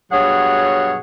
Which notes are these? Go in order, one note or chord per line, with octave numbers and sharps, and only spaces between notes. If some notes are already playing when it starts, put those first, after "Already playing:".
G2 B2 F#3 G#4 C#5 F#5